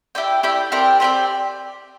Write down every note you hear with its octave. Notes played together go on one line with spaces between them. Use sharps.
E4 G4 D5 G5
E4 G4 D5 G5
C4 G4 A#4 D5
C4 G4 A#4 D5